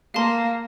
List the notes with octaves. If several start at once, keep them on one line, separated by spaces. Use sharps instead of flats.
A#3 F5 A5 C6